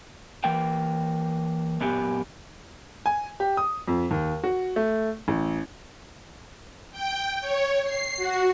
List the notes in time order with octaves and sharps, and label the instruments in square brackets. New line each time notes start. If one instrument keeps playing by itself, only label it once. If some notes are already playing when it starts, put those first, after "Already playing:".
[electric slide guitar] E3 A#3 G5
F#2 A#2 B3 G4 G#5
[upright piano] G#5
G4
D#6
F2
D#2
F#4
A3
A1
[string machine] G5
C#5
C7
F#4